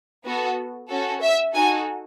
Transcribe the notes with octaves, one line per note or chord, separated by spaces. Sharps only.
B3 F#4 A4
C#4 F#4 A4
E5
D#4 F#4 A4 G#5